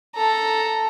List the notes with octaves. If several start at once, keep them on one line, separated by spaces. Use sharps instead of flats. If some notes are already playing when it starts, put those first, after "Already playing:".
A4 A#5